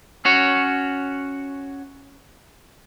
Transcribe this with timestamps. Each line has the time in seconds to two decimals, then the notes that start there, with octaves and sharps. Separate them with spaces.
0.25 C#4 F#4 C#5